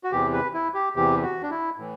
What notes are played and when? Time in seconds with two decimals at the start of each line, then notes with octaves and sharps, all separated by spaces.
0.04 F#4
0.12 E2 C3 E3 G4
0.33 B4
0.54 E4
0.74 G4
0.96 E2 C3 E3 G4
1.23 F#4
1.43 D4
1.50 E4
1.78 A2 E3